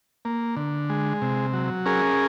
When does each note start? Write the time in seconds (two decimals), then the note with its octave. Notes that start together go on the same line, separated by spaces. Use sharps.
0.25 A#3
0.56 D3
0.90 G#3
1.22 C3
1.54 F#3
1.86 C#4 G#4 A#4